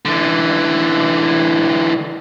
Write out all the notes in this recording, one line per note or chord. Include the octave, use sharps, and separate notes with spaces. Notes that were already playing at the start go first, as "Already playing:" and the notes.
D3 E3